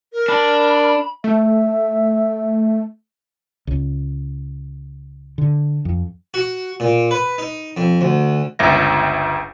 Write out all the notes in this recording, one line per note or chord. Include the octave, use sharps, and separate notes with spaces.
A#4
D4 B5
A3 E5
C#2
D3
F2
F#4
A#2
B4
D#4
F2
D2
G1 C#2 E5 A#6